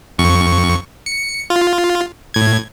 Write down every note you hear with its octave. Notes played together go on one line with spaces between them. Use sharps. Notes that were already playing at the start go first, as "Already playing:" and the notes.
F2 C#6
C#7
F4
A2 G#6